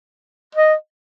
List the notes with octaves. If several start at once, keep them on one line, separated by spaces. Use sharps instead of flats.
D#5